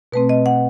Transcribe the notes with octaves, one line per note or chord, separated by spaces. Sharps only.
B2 A3 C4 B4
D#5
F#5